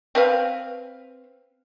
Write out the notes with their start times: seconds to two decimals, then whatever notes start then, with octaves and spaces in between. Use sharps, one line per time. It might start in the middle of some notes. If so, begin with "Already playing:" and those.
0.15 C4 B4 F5